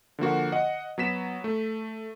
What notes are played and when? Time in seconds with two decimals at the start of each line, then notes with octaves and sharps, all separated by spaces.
0.19 D3 F3 A#3 F#4
0.52 D#5 F#5
0.98 F#3 B3 B6 E7
1.44 A3